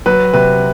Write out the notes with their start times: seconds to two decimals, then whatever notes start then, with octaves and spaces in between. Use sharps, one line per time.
0.06 F#3 B4
0.34 C3 B4